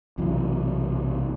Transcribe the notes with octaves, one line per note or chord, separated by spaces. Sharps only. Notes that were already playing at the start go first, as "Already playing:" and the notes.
B1 C3 E3 F#3